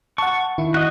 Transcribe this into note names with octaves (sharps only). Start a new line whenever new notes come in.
F#5 A5 C#6
D#3 E4
F#4 D#5